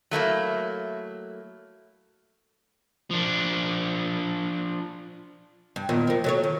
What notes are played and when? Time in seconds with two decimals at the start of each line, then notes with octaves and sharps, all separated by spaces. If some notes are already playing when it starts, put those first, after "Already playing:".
0.11 F#3 A3 A#3 E4
3.11 F3 D4
5.76 G2
5.89 E2 A#2 D#3
6.07 F3 A#3
6.24 F#3 A3 C#5
6.44 D#3